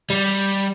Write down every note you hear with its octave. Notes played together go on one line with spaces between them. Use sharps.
G3